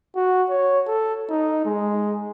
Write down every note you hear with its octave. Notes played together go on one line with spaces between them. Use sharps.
F#4
C#5
A4
D#4
G#3